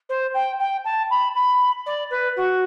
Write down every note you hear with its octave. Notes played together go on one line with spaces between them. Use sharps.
C5
G5
G5
A5
B5
B5
D5
B4
F#4